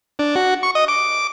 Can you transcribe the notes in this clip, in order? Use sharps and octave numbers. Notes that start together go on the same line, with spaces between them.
D4
F#4
C#6
D#5
D6